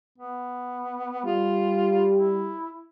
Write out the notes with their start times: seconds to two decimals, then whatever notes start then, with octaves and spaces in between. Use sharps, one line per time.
0.18 B3
1.25 G3 F4
2.16 E4